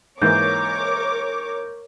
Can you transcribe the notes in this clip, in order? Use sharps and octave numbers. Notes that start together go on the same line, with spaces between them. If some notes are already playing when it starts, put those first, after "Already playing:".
G#2 E3 A#3 A#4 C#5 D6 G6